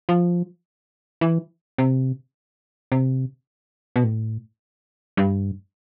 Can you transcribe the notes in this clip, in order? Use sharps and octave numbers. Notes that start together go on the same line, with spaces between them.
F3
E3
C3
C3
B2
A2
G2